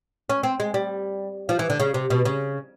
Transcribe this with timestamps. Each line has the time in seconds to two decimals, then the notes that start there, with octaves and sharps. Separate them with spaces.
0.30 C#4
0.43 C4
0.60 G#3
0.74 G3
1.49 F3
1.59 E3
1.70 D3
1.80 C#3
1.94 C3
2.10 B2
2.25 C#3